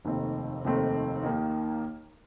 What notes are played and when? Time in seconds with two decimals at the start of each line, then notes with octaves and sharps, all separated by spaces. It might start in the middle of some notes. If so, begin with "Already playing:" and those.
0.05 F1 D#2 D#3 A3 C4
0.64 F1 D#2 D#3 A3 C4
1.23 D#2 D#3 A#3 D#4